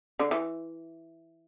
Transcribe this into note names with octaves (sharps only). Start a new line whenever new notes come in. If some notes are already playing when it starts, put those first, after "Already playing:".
D3
E3